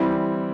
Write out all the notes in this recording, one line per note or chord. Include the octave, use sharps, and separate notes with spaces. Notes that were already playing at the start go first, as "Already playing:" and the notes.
Already playing: E3 G3 C4 E4